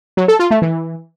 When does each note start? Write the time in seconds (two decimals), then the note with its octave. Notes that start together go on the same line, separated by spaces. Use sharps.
0.17 F#3
0.28 A4
0.39 F4
0.51 A3
0.62 E3